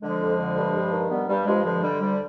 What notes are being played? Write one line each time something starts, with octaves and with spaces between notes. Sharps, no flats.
D3 F3 G#3
F2
D3
G2
G2
D#3
G2 G3 B3
G2 G3
G2 F3 G#3
D3 F3 G#3
D3 G3
D2 G3